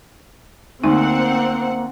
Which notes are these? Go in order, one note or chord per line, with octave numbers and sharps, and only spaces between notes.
D2 A#3 C4 D#4 F#5